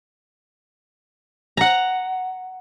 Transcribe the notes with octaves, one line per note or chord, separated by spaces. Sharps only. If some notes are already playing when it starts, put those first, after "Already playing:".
F#5 A#5